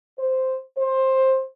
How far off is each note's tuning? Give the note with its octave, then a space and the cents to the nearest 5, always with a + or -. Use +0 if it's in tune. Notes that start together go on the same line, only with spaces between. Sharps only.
C5 -5
C5 +15